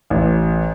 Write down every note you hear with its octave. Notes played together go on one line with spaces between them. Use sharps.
A1